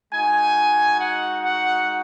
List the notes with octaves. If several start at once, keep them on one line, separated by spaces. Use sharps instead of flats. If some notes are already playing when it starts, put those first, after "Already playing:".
G#3 D#4 F#4 G#5
F#5
F#5